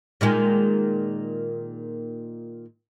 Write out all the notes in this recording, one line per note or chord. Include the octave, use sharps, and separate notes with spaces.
A#2 D#3 G#3